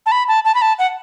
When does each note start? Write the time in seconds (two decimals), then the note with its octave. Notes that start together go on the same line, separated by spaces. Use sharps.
0.06 A5
0.12 B5
0.28 A5
0.45 A5
0.55 B5
0.62 A5
0.79 F#5